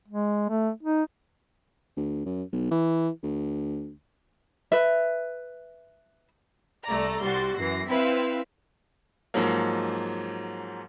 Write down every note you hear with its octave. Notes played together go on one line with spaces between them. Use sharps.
G#3
A3
D#4
D2
F#2
B1
E3
D2
B4 E5
C2 A3 D5 A#5
C2 G3 F#4 C6 A6
F#2 E3 A#6 C7
C4 E4 B4 E5 F5
G#2 F3 F#3 A#3